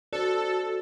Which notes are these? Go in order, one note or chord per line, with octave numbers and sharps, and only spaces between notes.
F#4 A4 C5 D5